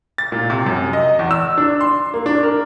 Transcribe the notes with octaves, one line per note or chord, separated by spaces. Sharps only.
A6
A#2
C3
F#2
D#5
E2
E6
D4
C6
A#3
D4
A#4